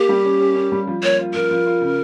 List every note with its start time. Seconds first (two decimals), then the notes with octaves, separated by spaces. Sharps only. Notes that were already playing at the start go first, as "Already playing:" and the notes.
Already playing: A#3 G4
0.09 G3
0.25 C#4
0.40 C#4
0.56 C#4
0.72 G3
0.87 F3
1.03 A#3 C#5
1.19 F4
1.34 F3 A#4
1.51 F3
1.66 F4
1.81 C#3